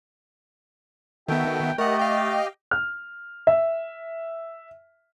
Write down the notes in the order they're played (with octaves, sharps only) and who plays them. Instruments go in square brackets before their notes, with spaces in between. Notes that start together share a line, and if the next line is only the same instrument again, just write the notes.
[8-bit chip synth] D#3 B3 [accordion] F#4 A4 E5 [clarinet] G5
[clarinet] A3 [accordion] G4 D#5 [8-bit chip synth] A#4 F#5
[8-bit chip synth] F5 G5
[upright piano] F6
E5